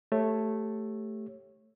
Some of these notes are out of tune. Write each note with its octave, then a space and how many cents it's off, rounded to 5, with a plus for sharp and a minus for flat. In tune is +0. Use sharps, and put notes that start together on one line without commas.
A3 +0 G4 +0 C#5 -20